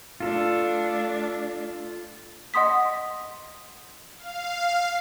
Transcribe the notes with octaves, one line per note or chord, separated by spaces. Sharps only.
A3 D4 F4 A4
D#5 F#5 C6 D#6 B6
F5